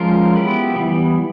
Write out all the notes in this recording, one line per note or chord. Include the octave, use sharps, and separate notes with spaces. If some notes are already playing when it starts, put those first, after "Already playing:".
Already playing: F3 G#3 C#4 F4 A#4
B3 E4 G4 B4
E3 G3 B3